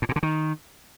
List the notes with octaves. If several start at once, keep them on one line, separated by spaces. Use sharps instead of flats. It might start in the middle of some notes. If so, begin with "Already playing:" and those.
A2
A#2
D3
D#3